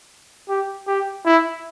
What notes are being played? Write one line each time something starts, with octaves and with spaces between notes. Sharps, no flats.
G4
G4
E4